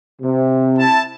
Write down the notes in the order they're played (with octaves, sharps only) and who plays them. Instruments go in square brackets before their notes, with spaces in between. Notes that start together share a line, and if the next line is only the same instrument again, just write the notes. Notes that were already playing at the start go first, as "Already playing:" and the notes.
[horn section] C3
[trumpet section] E4 A5